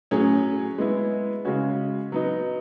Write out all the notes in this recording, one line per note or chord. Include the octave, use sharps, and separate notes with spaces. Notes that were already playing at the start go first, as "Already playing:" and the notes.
A2 F#3 C#4 G#4
G#3 B3 E4
C#3 G#3 C#4 F#4
F#3 B3 D#4